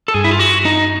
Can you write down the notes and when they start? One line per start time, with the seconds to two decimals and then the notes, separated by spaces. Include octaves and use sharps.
0.08 A4
0.14 G2 G#4
0.24 E4
0.31 F4
0.40 F#4
0.65 D#4